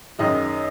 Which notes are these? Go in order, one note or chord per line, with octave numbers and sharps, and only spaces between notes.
F#2 D#3 G#3 D#5